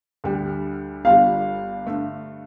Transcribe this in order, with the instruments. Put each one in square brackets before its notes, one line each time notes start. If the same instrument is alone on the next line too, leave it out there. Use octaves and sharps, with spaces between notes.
[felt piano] D2 D3 G3
[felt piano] G1 G2 G3 D4 F4 [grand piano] F5
[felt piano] G2 D3 A3